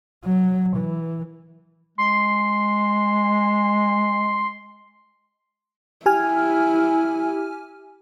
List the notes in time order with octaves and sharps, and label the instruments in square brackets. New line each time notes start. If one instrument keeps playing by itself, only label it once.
[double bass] F#3
E3
[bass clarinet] G#3 [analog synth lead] C6
[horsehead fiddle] E4 [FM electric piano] G4 G#5 F6